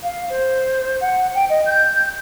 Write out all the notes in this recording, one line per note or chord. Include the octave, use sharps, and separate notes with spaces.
F5
C5
F#5
G5
D#5
G6